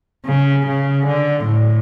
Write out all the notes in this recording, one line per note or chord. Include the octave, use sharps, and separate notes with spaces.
C#3
C#3
D3
A2